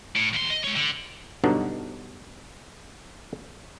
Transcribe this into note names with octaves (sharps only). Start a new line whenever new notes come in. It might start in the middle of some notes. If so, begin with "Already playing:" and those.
A2
D#2 C6
D#5
G#3 C#5
D3
G2 B2 D3 F#3 D4 D#4